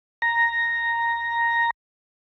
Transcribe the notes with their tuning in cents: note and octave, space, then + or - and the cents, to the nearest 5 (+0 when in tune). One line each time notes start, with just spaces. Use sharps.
A#5 +0